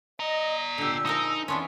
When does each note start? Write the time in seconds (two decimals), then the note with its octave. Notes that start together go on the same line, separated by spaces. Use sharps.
0.20 D5 D#5 A#5
0.78 A#2 D3 G4 E6
1.06 F3 G#3 D#4 A#4
1.48 F2 E3 B3 C#4 D4 C6